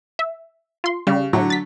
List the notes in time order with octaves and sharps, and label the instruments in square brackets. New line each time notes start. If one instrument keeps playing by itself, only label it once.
[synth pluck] E5
F4 C6
[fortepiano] C#3 [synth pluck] G3
[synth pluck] A2 [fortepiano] D3 F#3
[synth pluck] A6 B6